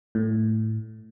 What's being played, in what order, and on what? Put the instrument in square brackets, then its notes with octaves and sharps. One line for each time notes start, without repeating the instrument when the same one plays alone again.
[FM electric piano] A2